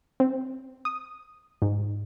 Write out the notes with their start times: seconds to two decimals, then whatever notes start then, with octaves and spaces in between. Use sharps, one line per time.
0.20 C4
0.85 D#6
1.62 G#2